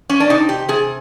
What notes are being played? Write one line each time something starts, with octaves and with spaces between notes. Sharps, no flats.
C#4
D4
C3 D#4
G4
C3 G#4